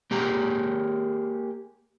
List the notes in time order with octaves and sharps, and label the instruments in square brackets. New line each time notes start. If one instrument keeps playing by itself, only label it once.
[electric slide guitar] A#3 G4 G#4 A#5